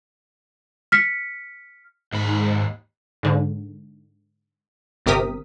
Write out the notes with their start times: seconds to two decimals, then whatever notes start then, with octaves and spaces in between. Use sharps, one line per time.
0.92 F6 B6 C#7
2.12 D#2 G#2 B5
3.23 G#2 D3
5.06 G1 C3 G4 A#4 D#6 B6